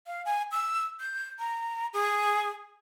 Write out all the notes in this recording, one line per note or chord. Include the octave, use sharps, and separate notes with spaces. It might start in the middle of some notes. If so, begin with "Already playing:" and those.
F5
G#5
E6
G6
A#5
G#4